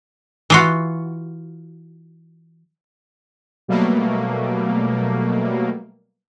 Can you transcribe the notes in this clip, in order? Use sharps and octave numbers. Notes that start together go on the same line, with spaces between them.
E3 F4 F#4
B2 F#3 G3 A3 A#3